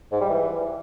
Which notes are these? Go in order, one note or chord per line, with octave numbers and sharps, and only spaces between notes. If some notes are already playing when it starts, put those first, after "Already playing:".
G#2
G3
E3